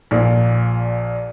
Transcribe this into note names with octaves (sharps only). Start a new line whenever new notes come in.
A#1 A#2